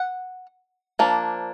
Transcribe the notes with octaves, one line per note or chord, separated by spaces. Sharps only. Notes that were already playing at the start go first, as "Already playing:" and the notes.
Already playing: F#5
F3 A#3 D4